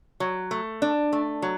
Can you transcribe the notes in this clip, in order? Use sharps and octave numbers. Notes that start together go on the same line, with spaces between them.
F#3
A3
D4
A3
F#3